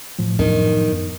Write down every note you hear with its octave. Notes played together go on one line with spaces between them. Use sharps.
A2 F3
F#2 D#3 B3 D4